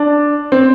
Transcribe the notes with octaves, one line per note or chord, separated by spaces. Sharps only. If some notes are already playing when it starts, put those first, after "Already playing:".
Already playing: D4
C4